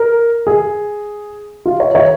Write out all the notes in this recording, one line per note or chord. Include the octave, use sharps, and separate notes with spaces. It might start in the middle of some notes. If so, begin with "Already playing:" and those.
Already playing: A#4
G#4
F4
C#5
C#5